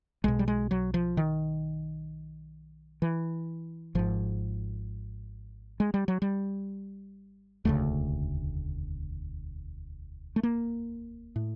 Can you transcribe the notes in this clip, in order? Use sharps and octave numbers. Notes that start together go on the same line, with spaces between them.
B1 B2 G#3
G3
G#3
F#3
F3
D#3
E3
G#1 G#2 F3
G#3
G3
F#3
G3
E1 D2 C#3 A3
A3
A#3
A2